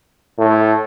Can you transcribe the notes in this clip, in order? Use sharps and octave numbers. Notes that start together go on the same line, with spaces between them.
A2